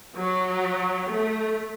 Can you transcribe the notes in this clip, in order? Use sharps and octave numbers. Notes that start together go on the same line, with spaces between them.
F#3
A3